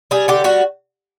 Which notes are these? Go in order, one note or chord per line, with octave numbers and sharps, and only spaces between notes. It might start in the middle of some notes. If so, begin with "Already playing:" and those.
G3 G#4
D3 G4
G3 F#4